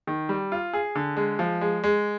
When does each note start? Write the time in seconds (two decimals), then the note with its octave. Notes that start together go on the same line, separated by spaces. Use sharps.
0.07 D#3
0.29 G3
0.52 F4
0.73 G#4
0.95 D3
1.17 G#3
1.39 F3
1.61 G#3
1.84 G#3